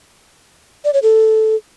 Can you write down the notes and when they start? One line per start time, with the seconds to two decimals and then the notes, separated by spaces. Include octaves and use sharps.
0.84 D5
0.93 C#5
1.02 A4